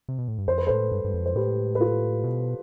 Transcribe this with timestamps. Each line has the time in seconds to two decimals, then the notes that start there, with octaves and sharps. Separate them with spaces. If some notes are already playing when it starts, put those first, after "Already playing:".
0.09 C3
0.18 B2
0.28 A2
0.38 G2
0.48 F2 C5
0.58 B4
0.67 A2 A4 C5
0.92 G2
1.04 G2
1.14 F2
1.26 C5
1.36 A2 G4 B4
1.75 B4
1.80 F4 A4
2.24 B2